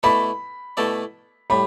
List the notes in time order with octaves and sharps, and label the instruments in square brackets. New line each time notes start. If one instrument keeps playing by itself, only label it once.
[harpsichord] B2 A3 E4 A4 D5 [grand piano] B5
[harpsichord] B2 A3 E4 A4 D5
[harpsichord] A2 G3 [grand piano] B5